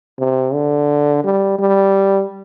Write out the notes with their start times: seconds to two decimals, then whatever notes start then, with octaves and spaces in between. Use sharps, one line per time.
0.19 C3
0.54 D3
1.24 G3
1.59 G3